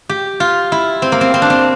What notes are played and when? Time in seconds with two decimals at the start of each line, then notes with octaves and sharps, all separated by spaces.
0.09 G4
0.40 F4
0.72 E4
1.02 C4
1.12 A#3
1.21 C4
1.34 C4
1.42 D4
1.50 C4